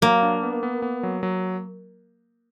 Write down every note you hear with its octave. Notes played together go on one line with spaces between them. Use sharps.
F#3 A#3
D4
B3
B3
B3
F#3
F#3